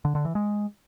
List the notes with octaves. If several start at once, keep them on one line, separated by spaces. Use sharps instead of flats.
D3
D3
E3
G#3